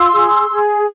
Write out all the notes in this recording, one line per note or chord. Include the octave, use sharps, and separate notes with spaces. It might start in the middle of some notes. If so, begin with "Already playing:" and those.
Already playing: F4 C6 E6
G#4
G#4